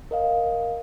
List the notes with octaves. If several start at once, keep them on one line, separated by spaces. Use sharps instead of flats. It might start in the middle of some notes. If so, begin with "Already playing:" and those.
A#4 D#5 F5